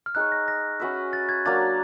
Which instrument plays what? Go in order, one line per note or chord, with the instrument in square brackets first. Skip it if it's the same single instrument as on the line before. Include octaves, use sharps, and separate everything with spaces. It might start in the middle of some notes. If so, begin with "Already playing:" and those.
[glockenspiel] F6
[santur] D#4 G#4 C#5 [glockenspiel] F#6
[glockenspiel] A#6
A#6
[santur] C#4 F#4 B4 E5
[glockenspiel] A6
G#6
[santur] F#3 A#3 D4 [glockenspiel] A6